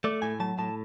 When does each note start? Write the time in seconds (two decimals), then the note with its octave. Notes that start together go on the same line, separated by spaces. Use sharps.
0.04 A3 D5
0.22 A2 G#5
0.40 F#3 A5
0.59 A2 A5